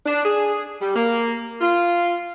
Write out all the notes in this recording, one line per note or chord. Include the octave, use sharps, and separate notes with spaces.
D4
G#4
G3
A#3
F4